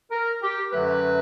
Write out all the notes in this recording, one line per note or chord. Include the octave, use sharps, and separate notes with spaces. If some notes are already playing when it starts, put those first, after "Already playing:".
A#4
G4
F#2 D3 F#3 A3 B4